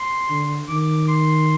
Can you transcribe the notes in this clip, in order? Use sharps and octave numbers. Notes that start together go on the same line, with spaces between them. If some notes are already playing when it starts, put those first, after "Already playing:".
Already playing: C6
D3
D#3 D6
C6